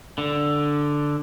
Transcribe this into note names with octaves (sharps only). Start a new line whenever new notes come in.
D3